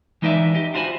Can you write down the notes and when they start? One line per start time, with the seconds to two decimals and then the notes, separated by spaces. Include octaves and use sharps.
0.22 E3 G#3 D#4 B4 D5 E5
0.55 G4 D#5
0.74 D4 F4 F#4 C5 G#5 B5